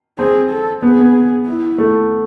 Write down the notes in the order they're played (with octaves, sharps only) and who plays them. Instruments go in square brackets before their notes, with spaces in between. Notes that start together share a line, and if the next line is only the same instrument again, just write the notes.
[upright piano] C4 [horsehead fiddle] G#4
[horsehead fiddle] A4
[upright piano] B3 [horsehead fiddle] G#4
[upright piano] B3
[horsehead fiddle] E4
[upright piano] A3